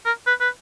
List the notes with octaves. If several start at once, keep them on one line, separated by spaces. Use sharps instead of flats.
A#4
B4
B4